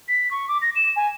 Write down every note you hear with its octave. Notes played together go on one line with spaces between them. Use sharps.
B6
C#6
D6
A#6
E7
G#5